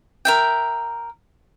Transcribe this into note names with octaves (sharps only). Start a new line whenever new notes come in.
A#4 E5 G5